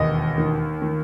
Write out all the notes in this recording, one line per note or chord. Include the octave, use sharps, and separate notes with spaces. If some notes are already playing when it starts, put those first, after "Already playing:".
Already playing: E1 D#2 D#5
D#3
D#3